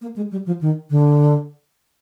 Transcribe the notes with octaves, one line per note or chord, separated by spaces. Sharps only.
A#3
G#3
G3
F3
D#3
D3